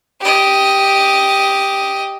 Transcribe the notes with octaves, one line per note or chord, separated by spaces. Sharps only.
G4 D#5